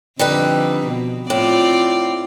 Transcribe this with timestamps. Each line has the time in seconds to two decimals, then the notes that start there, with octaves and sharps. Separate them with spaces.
0.19 F2 D3 G3 D#4 B4
0.87 B2
1.30 A2 C4 F4 D5